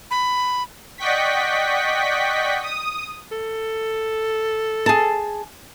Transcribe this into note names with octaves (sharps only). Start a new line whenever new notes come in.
B5
D5 D#5 F#5 G5 C#6 B6
D#6
A4
G#4 A5